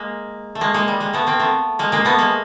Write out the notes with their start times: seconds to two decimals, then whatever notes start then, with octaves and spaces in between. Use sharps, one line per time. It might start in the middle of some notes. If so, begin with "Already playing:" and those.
Already playing: G#3 A#3
0.55 A3
0.61 G#3 A#3
0.74 G#3 A#3
0.88 G3
1.00 G#3 A#3
1.13 A3 B3
1.27 A#3 C4
1.39 A3 B3
1.79 G#3 A#3
1.92 G#3 A#3
2.05 A3 B3
2.18 G#3 A#3